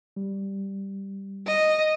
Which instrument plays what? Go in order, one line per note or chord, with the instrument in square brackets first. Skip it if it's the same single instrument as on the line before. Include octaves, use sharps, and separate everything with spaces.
[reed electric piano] G3
[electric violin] D#5